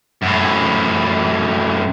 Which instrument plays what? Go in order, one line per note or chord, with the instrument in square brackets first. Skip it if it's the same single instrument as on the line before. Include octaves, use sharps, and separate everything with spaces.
[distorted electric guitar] F#2 A2